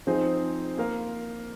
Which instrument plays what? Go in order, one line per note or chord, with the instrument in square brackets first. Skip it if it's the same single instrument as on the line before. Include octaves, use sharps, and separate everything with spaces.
[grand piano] F3 C4 D#4 G#4 C5
A#3 F4 A#4 F5